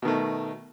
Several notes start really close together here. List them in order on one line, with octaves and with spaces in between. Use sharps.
B2 D#3 A3